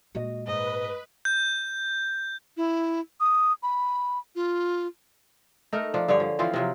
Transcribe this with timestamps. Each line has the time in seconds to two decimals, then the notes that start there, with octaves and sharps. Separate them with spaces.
0.15 A#2 G#3 F#4 D#5
0.47 G#2 B4 D#5
1.25 G6
2.57 E4
3.20 D#6
3.63 B5
4.35 F4
5.73 A3 D#4 A#4
5.94 F3 D4
6.08 G2 D3 G#4 C#5
6.20 F3
6.39 E3 F3 C4 F4
6.53 C3 F3 F#3